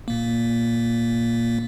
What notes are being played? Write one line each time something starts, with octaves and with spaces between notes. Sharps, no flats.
A#2 A#3